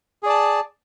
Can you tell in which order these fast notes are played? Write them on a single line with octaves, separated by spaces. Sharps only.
G#4 D5 A5